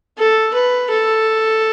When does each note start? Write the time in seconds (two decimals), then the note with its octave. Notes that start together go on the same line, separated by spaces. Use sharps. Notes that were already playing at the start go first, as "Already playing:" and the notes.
0.18 A4
0.54 B4
0.90 A4